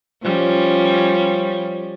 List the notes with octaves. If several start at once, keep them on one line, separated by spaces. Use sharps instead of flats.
F3 G3 C#4